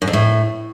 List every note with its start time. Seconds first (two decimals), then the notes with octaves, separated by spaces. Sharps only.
0.02 F#2
0.07 F2
0.13 A2